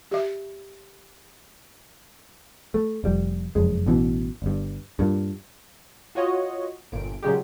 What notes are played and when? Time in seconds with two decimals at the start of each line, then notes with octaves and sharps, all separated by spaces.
0.11 G4 E5
2.74 A3
3.04 F1 G3
3.55 F#1 F2 G#3
3.86 A1 B2 E3
4.42 G1 G2
4.99 G2 A#2
6.15 F4 F#4 C#5 D#5
6.92 G1 A#2 D7
7.23 A#2 C#3 F#3 G#3 G4